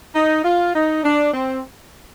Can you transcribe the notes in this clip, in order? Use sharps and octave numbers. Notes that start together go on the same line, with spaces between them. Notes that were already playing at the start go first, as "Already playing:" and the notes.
D#4
F4
D#4
D4
C4